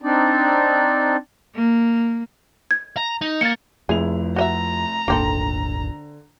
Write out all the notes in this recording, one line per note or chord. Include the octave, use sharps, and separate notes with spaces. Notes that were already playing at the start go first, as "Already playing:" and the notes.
C4 D4 D#4 D5
A#3
G#6
A#5
D#4
A#3 A6 C#7
F1 F2 E4 G#4 F7
F#4 D#5 E5 A#5
D#1 G#1 D3 A#3 C4 A4